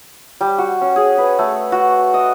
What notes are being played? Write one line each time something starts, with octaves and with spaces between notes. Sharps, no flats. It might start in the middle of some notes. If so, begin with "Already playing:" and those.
G3
F#4
C#4
G#4
B4
A3
F#4
D#5